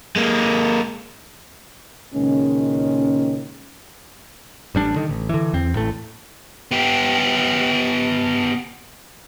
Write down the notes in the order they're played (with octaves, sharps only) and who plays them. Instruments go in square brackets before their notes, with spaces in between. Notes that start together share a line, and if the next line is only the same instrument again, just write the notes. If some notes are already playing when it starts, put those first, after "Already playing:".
[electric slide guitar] G#3 A#3
[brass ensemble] C#2 A#2 D#3 G#3 C#4
[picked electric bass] A1 G3 D4
D3 D#3
A1
D3 E3
E2 C4
A1 A2 A3
[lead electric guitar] B3 G4